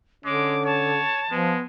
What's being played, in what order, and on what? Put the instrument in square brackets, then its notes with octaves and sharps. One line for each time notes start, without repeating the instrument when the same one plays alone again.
[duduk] D3 [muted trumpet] G#3 [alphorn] C#4 [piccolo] D6
[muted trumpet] C#5 [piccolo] A5
[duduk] F3 [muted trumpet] G#3 [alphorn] B3